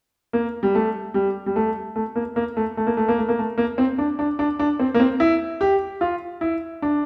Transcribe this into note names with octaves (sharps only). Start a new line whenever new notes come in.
A#3
G3
A3
G3
G3
A3
A3
A#3
A#3
A3
A3
A#3
A3
A#3
A3
A#3
A3
A#3
C4
D4
D4
D4
D4
C4
A#3
C4
E4
G4
F4
E4
D4